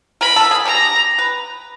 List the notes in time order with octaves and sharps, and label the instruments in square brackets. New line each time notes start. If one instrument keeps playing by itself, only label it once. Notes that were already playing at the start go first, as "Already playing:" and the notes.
[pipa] A#4 [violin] B5
[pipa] A4
G#4
[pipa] G4 [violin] A#5
[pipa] B4